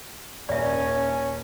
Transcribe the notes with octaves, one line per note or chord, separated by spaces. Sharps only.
D#1 C#4 C#5 D5 E5